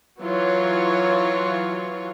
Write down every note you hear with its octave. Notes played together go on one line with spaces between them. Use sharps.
E3 F#3 F4 C#5